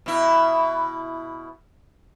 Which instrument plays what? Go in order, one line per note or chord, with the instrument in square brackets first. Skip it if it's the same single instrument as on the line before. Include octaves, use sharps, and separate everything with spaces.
[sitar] B2 E4